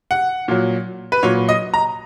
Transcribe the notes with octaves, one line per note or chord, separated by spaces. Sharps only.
F#5
A#2 F#3
B4
A#2 F#3 C#5
D#5
A#5